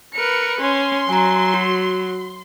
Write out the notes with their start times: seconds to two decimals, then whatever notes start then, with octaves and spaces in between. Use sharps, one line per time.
0.16 A#4 B4 C#7
0.61 C#4 C6
1.09 F#3 G#5 A#5
1.54 F#4